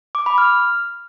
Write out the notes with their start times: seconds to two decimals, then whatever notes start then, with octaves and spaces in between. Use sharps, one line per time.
0.15 D6
0.26 B5
0.38 F6